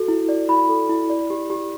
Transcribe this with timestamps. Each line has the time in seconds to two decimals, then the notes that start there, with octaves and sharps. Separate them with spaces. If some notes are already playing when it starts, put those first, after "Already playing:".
Already playing: F#4 A4
0.08 E4
0.29 D5
0.48 E4 B5
0.69 A4
0.89 E4
1.10 D5
1.30 G4
1.50 G4